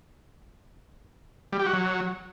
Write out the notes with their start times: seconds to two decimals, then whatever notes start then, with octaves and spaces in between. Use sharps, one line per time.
1.53 G3
1.60 G4
1.66 F#4
1.73 F#3